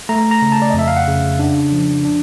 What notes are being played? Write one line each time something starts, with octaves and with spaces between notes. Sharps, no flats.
A3 A#5
A#5
C#3
A5
D5
D#5
F2 E5
F5
F#5
C#3
D4
F3
D4